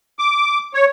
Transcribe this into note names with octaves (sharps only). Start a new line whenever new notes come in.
D6
C#5